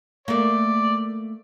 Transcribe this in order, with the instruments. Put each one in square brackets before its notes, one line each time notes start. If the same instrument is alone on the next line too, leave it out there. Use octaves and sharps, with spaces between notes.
[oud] A3 A#3 [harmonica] D5